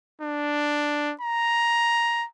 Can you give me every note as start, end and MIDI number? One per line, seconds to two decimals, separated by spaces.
0.21 1.13 62
1.21 2.25 82